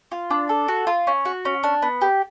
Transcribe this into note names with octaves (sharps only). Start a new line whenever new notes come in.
F4
D4
A4
F#4
F4
C#4
F#4
C#4
D4
B3
G4